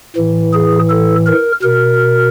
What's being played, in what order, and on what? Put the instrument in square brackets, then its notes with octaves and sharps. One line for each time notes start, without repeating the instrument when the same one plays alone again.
[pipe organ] A2 E3
G#4
A4
A#4
B2 A#4